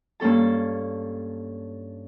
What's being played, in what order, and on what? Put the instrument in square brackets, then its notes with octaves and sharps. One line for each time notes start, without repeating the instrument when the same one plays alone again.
[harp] G2 A#3 C#4 A4 A5